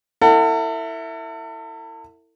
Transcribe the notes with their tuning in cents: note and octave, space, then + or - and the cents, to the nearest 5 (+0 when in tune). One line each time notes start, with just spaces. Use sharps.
E4 +0 A4 +40 F#5 -15